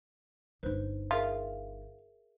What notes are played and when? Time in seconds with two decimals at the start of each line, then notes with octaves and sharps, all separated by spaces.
0.63 G1 D#4 B4 C5
1.11 F4 G#4 A#4 E5